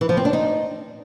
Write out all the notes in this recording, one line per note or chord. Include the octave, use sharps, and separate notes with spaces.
E3
F3
C4
D4
D#4